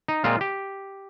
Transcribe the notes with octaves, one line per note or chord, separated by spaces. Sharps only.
D#4
A#2 G#3 C4 F4
G4